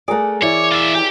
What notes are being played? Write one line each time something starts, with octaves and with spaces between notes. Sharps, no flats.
A3 G#4 A#4 D5 F#5
E3 E4 C#5 D5
F4 E5
G4 E5 G#5